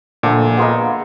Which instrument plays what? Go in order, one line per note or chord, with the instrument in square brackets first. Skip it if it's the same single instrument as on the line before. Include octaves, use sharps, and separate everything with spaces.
[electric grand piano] A#2 [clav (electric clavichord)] D3 F3 A3
[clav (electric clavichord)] B3 F4 A#5 [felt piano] G#4 D#5